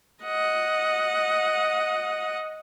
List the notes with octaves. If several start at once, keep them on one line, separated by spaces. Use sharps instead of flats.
D#5 F#5